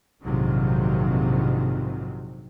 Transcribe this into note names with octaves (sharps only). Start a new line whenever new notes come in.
A#1 F2 G#2 C3 D#3 F#3